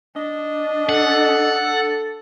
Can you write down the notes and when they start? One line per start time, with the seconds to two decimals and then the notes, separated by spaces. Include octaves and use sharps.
0.16 D4 D#5
0.89 A4 F#5